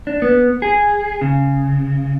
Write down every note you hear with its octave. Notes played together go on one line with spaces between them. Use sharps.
D4
B3
G#4
C#3